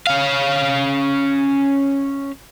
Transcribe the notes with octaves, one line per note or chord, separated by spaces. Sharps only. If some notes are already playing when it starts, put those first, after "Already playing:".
C#4 F5